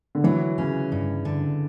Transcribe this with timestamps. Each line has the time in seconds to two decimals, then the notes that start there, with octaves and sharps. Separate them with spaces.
0.15 D3
0.24 E3 F#3
0.58 C#3 C#4
0.92 G2
1.25 D3